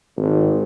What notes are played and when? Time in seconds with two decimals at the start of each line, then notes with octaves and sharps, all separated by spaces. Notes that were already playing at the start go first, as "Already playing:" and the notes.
0.16 G#1